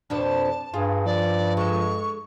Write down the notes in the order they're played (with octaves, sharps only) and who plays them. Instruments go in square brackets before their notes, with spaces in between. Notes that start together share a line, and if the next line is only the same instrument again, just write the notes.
[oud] F2 B2 F3 [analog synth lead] D4 [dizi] A5
[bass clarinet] G2 [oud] F4 [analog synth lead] G#4
[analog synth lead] F3 [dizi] D5
[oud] G#3 A4 [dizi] C#6